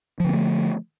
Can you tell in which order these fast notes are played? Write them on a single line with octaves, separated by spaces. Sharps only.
F3 D3 B3 A3